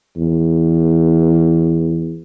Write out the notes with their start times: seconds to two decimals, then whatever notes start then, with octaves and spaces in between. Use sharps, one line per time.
0.16 E2